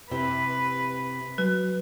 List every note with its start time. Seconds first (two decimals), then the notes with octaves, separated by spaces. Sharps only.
0.11 C3 E4 G4 B4
1.38 F#3 B4